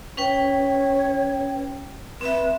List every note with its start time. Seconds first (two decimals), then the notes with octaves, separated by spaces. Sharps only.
0.17 C#4 B4 C#5 G5
2.21 C4 B4 E5